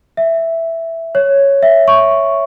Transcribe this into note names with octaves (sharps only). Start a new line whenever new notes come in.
E5
C#5
E5
C#6